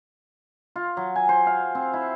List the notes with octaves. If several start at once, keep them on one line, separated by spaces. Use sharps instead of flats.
F4
F#3
G#5
C5
F5
C4
E4